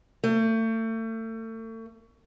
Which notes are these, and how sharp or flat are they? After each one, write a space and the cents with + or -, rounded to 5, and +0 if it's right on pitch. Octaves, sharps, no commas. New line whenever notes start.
A3 +35